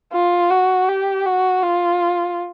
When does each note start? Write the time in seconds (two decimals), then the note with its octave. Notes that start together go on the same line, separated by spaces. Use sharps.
0.13 F4
0.51 F#4
0.89 G4
1.26 F#4
1.63 F4